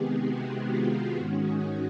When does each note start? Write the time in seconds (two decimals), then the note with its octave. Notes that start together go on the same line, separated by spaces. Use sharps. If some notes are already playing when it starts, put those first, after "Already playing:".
Already playing: C3 D#3 G#3 B3 G4 G#4
0.24 F#4
0.69 F4
1.15 G#2 D#3 G#3 C#4 F#4
1.46 G#4